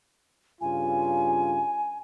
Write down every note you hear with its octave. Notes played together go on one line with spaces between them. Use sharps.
G2 C#3 F4 G#5